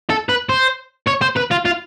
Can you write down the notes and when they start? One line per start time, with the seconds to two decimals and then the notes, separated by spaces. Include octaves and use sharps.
0.10 A4
0.29 B4
0.49 C5
1.07 C#5
1.21 C5
1.36 B4
1.51 F4
1.65 F4